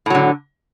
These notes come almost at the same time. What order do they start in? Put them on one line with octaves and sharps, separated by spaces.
A2 F#3 D3